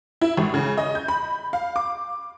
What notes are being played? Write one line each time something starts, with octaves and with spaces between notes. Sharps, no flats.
E4
G#1
C#3
D#5
G6
B5
F5
D6